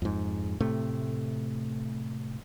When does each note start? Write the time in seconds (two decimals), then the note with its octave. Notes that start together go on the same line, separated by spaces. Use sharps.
0.02 F2 G#2
0.61 A2 C3 A3